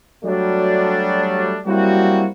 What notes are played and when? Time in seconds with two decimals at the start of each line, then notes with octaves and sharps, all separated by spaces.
0.24 F#3 G3 A3 D4
1.66 F#3 G3 A#3 C4 E4 F#4